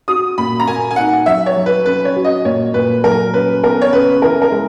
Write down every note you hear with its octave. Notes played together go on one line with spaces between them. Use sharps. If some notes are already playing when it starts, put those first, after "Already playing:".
F#4 D#6
A#2 B5
A#5
A#3 G#5
G#5
D#4 F#5
F#3 E5
C#5
F#3
B4
C#4 B4
C#5
F#4
D#5
A#2 C#5
A#2 B4
F#3 A#4
C#4 B4
B3 A#4
C#5
C#3 B4
E3 A#4
A#4
G#3